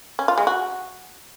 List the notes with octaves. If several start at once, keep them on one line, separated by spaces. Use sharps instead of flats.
C#4
F4
G#3
F#4